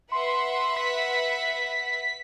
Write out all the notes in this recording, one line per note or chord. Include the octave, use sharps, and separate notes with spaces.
B4 E5 F#5 C6
B6